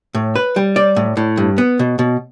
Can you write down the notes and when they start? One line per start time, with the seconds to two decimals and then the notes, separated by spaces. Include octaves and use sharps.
0.15 A2
0.35 B4
0.56 G3
0.76 D5
0.96 A2
1.17 A2
1.37 G2
1.58 B3
1.79 B2
1.99 B2